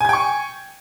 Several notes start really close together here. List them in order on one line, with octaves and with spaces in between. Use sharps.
G#5 G#6 G5 C#6